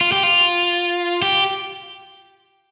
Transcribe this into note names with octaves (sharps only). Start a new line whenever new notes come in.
F4
G4
F4
G4